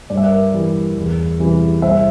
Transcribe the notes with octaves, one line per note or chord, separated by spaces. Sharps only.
G2 D5
E5
A#4 D5
E3 G3
E2
C3 E3 G3
C2 C5 E5